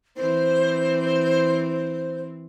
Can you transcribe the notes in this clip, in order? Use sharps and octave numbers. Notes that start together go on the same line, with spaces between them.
E3 C4 C5